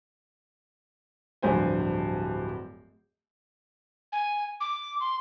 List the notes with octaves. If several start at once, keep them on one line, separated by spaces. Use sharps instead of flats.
D1 G2 F3 C5 G#5
G#5
D6
C6